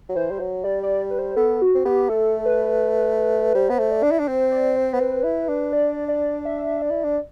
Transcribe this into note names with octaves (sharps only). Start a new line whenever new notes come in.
F#3
E3 C5
G3
F#3
G3 D5
D5
B4
C5
B3 A4
F#4
C4
B3 G4
A3 A4
B4
G3 C5
B3
A3
D5
D4
E4
D4
C4 C5
D5
C5
B3
C4 B4
E4
D4
D5
D5
E5
D5
E4
D4